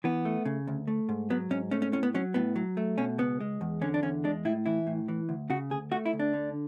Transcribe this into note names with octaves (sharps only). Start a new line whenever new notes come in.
E3 B3
A3
C#3
D2
A3
G#2
F#3 B3
G#2 C#4
A3 C#4
C#4
A2 C#4
B3
F#3 C#4
A2 B3
F#3
A3
B2 C#4
C#2 B3
G#3
E2
D3 C#4
D4
E2 C#4
G#3 D4
A2 E4
E3 E4
A2
E3
D2
C#3 F#4
D2 G#4
A3 F#4
E4
D2
D4
D3